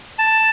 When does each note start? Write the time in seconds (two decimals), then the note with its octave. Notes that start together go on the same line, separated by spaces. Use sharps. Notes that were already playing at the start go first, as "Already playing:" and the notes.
0.19 A5